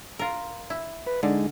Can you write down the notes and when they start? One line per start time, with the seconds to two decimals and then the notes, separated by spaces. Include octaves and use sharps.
0.19 F4 A#4
0.70 E4
1.07 B4
1.23 D3 G#3 D#4